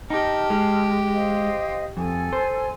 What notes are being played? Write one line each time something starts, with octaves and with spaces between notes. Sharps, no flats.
D#4 G4 A5 F6
G#3
C5 D#5 F5
F2 A4 G#5
C5